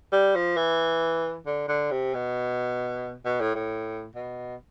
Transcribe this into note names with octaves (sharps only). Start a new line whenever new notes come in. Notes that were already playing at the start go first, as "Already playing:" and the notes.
G3
F3
E3
D3
D3
C3
B2
B2
A2
A2
B2